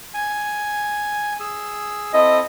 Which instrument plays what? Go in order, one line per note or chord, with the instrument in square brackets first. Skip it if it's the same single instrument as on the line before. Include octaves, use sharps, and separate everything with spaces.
[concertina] G#5
G#4 E6
[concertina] C4 E4 A4 [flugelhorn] D#5